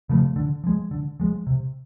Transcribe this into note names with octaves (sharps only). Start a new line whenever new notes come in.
C#3 F3 A3
D3
F3 G#3
D3
F3 G#3
C3